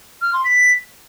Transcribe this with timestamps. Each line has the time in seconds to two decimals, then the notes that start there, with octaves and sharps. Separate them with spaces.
0.21 F6
0.33 C6
0.44 B6